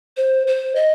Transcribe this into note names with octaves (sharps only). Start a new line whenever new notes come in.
C5
C5
D#5